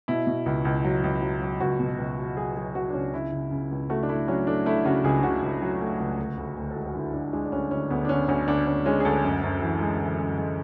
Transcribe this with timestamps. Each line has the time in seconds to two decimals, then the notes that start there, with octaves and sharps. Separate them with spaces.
0.08 B2 E4
0.27 B2
0.46 C#2
0.65 C#2
0.84 F#3
1.04 C#2
1.22 F#3
1.42 F#3
1.60 C#2 F#4
1.80 B2
1.98 C#2
2.18 F#3
2.37 F#3 G#4
2.56 F#3 G#4
2.75 F#3 F#4
2.90 D4
2.94 C#2 C#4
3.14 C#3 E4
3.32 C#3
3.51 C#3
3.71 C#2
3.90 A3 F#4
4.03 D4
4.09 A3 E4
4.28 F#3 C#4
4.47 A3 D4
4.66 A3 E4
4.85 C#3 F#4
5.04 C#2 G#4
5.23 C#3 F#4
5.42 C#2
5.62 F#3
5.81 A3
6.00 C#2
6.19 D2
6.38 D2
6.57 D2
6.70 A4
6.76 G#3 G#4
6.86 F#4
6.95 D3 E4
7.13 D3 D4
7.33 G#3 D4
7.45 D4
7.52 D2 C#4
7.71 D2 C#4
7.90 D2 B3
8.05 D4
8.09 D3 C#4
8.28 D2 C#4
8.47 D2 D4
8.67 D2 C#4
8.85 G#3 C#4
9.00 G#4
9.05 D2 A4
9.24 F#2
9.43 F#2
9.61 E3
9.81 G#3
10.00 E3
10.19 F#2
10.38 G#3